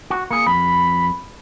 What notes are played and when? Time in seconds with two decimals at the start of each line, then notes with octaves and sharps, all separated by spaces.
0.10 F#4
0.31 A#3 G#4 C#7
0.47 F2 B5